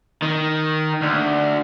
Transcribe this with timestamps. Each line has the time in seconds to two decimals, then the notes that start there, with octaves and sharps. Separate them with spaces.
0.22 D#3
1.01 D2